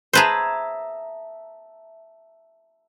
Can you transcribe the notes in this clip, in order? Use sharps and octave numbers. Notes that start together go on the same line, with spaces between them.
G#4 B4 C5 E5 A5 A#5